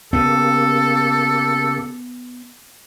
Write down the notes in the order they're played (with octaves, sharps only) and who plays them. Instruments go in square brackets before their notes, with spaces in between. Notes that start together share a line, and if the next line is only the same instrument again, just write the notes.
[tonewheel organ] C#3 A#3 G4 [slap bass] B3 [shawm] A4